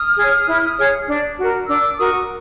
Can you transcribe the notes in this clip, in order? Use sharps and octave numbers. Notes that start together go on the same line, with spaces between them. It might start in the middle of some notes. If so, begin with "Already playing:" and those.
Already playing: D#6 F6
G#4 C#5
E4
G#4 C#5
D4
F#4 A#4
D4 D6 E6
F#4 A#4 C#6 D#6